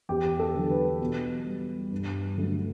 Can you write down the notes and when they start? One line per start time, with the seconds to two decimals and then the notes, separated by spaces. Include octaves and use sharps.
0.09 E2 G4
0.40 A4
0.55 D3 F#3
0.70 B4
1.00 B2
1.46 G3
1.92 G2
2.37 D3 F#3 A3